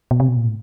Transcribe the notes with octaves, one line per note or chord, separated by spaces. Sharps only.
B2
C3
B2
A#2
A2